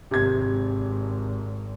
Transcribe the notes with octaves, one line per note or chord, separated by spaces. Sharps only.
G#1 C3 G#6